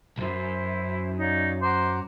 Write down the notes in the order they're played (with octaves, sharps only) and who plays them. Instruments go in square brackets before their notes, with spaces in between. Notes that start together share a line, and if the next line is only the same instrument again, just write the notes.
[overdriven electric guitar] C2 F#2 [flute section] E4 C5
[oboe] D#4 [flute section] C#5 D5 F5
[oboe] C5 [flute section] F#5 A#5 D6